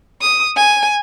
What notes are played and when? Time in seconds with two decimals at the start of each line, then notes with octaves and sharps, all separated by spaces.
0.21 D#6
0.57 G#5